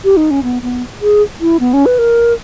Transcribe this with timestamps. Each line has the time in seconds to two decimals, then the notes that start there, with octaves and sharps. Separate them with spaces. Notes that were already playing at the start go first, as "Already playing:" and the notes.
0.04 G4
0.17 D#4
0.31 C#4
0.43 B3
0.62 B3
1.02 G#4
1.41 E4
1.60 B3
1.74 C#4
1.86 B4
1.99 A#4